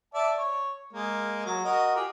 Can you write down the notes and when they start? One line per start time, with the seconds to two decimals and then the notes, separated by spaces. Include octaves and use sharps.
0.14 D5 E5 A5
0.38 C#5
0.93 G#3 A#3
1.46 F#3
1.65 F#4 A#4 D#5
1.96 F4 G4 G#4